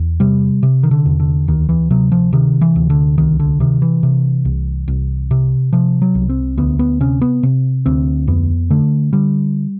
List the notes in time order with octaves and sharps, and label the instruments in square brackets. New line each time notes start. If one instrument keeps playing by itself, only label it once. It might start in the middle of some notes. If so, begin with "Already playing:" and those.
Already playing: [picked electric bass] E2
C3 G3
C3
D#3
D3
E2
D3
D2 D#3
E3
C3 F#3
F3
C3 D#3
E3
D2
D3
C2 D#3
D3
C3 D#3
E3
C3
C2
C2
C3
C3 F3
F#3
C2
C4
D2 B3
B3
C3 C#4
B3
C3
D2 C4
F2 B3
D3 A3
D3 G3